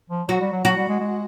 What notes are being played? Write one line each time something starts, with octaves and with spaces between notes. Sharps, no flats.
F3
F#3 F#4
G3
F#3
F#3 F#4
G3
G#3
G#3